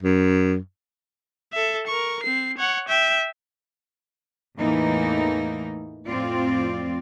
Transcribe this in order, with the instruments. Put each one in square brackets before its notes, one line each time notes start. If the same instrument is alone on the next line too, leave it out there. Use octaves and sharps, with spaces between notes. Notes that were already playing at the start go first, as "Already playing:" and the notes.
[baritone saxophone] F#2
[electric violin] A4 E5
A#4 C#6
C4 C7
C#5 F#5
E5 G5
[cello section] E2 A2 E3 A3 A#3 D#4
F2 A2 C4 F4 D5